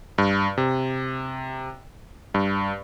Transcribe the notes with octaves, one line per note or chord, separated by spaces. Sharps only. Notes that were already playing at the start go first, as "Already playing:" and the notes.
G2
C3
G2